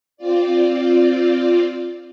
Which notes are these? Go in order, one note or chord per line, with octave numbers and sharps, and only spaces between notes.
C4 F4 D5